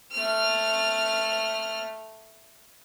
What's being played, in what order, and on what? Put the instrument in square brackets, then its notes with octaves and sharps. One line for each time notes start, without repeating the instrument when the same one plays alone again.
[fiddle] A3 F6